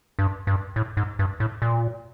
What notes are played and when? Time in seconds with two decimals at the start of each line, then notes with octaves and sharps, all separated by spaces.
0.19 G2
0.47 G2
0.76 A2
0.97 G#2
1.19 G2
1.40 A2
1.62 A#2